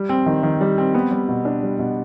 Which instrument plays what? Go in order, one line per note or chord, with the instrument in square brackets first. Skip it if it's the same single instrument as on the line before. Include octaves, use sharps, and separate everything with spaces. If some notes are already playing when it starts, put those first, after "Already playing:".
Already playing: [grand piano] G3
C4
D#3
D#3
G3
C4
B3
G3
B2
D4
G3
B2